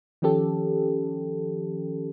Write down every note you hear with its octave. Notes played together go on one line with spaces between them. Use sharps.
D#3 F3 C#4 G4 A4